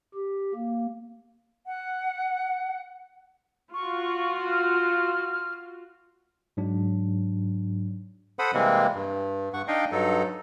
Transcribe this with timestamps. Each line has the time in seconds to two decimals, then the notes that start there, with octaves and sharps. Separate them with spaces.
0.14 G4
0.55 A#3
1.66 F#5
3.74 F4 F#4 C#6
4.51 F6
6.57 G#2 F#3 D4
8.39 A4 C5 F#5 B5 D#6
8.54 C3 E3 G3 G#3 A#3 C4
8.95 G2
9.54 G2 F#5 C#6
9.68 D4 D#4 D#5 F5 G5
9.92 G2 F#3 D#4 A4